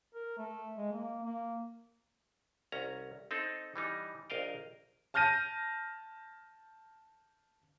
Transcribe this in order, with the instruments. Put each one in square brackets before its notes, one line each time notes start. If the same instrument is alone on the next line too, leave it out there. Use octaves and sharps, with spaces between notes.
[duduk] A#4
A3
G#3
A#3
A#3
[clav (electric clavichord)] C2 C#4 A#5
C4 D#4 A4
E3 G3 D#4
A#1 A#4 D#5 F5 G5
[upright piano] A5 F6 G6 A#6 D#7